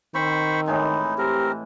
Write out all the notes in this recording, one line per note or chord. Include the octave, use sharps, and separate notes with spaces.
D#3 C4 C5 B5 C#6
A2 E3 G#3 D#4
C4 G4 A#4